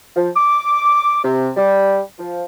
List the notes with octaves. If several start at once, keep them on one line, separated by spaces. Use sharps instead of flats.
F3
D6
C3
G3
F3